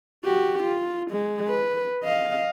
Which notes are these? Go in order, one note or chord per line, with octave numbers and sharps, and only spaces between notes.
F#4 G4
F4
G#3
B4
D#5 F5